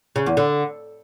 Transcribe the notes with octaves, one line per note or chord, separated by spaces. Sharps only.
C#3
E2
D3